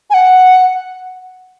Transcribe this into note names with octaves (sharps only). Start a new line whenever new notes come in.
G#5
F#5